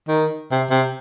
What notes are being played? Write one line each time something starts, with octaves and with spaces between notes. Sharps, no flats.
D#3
C3
C3